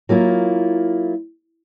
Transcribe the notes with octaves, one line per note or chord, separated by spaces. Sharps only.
F#3 A#3 E4 F4